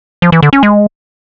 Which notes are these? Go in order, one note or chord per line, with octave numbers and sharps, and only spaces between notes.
F3
E3
D3
C#4
G#3